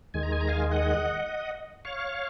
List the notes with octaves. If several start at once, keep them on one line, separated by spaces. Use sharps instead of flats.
D#2 D#3 G#3 G#5
A#5
G#5
A#5
F5 G#5
D#5 F#5
C#5 F5